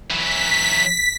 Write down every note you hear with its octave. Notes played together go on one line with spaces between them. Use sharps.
E3 F#3 B6